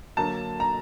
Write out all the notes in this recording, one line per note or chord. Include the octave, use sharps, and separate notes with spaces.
D3 F#3 A#3 A5
A#5